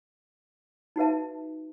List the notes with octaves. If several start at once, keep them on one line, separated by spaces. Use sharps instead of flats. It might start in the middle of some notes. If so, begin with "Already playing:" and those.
D#4 F#4 B4 E5 A5